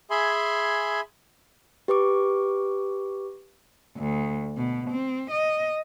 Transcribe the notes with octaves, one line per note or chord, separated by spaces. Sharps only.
G#4 E5 G#5 B5 C6
G4 B4 C#6 D6
D2
B2
C4
D#5